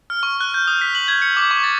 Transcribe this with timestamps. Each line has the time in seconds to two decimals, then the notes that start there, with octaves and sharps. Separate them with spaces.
0.10 F6
0.23 C#6
0.41 F#6
0.54 G6
0.67 D#6
0.81 B6
0.95 F#7
1.08 G#6
1.22 C#7
1.37 D6
1.51 C#6
1.64 A6